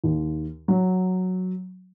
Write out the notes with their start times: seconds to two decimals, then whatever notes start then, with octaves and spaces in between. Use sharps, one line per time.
0.04 D#2
0.68 F#3